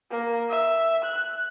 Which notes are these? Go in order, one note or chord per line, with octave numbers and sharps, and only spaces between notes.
A#3
E5
F#6